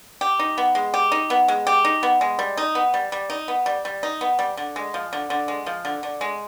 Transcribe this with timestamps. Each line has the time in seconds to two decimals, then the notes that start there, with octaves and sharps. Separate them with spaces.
0.21 G4
0.39 D#4
0.58 B3
0.75 G#3
0.94 G4
1.12 D#4
1.30 B3
1.48 G#3
1.67 G4
1.85 D#4
2.03 B3
2.21 G#3
2.39 G3
2.57 D#4
2.75 B3
2.94 G3
3.12 G3
3.30 D#4
3.48 B3
3.66 G3
3.85 G3
4.03 D#4
4.21 B3
4.39 G3
4.57 D3
4.76 G#3
4.94 F3
5.13 D3
5.30 D3
5.48 G#3
5.66 F3
5.85 D3
6.03 D3
6.21 G#3